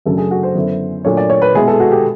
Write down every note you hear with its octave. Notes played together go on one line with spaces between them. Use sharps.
F#2 C#3 F#3 A3 D4 A4
G#4
F#4
C5
F#2 D3 F#3 B3 E4
A#2 F#3 A3 D4 C#5
D5
C#5
B4
B2 G#3 B3 E4 G#4
A4
F#4
G4